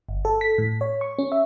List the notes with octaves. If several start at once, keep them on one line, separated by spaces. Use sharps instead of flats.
G1
A4
B6
A2
C#5
C#6
C#4
E5